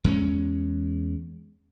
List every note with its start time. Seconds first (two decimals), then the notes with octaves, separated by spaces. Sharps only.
0.04 E2 G#3 C#4